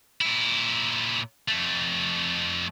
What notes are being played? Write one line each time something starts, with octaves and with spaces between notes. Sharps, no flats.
A#2 E4
F2 A3